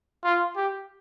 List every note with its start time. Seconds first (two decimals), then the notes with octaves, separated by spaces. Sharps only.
0.24 F4
0.57 G4